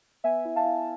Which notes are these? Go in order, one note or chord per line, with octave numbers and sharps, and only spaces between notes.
B3 E5 G#5
E4
F5 A5
E4